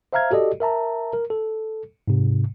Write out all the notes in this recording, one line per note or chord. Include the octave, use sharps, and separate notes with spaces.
C5 E5 F5 A#5 F6 G#6
F#4 G4 A4 D5 D#5
A#4 E5 A5 A#5
A#4
A4
G#2 C3